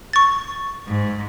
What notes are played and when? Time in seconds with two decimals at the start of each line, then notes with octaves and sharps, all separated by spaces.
0.13 C#6 A6
0.87 G#2